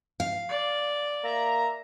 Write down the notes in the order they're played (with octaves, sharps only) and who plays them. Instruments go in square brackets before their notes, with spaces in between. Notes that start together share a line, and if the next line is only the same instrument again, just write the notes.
[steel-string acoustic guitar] F5
[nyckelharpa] D5
[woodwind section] A#3 E5 A#5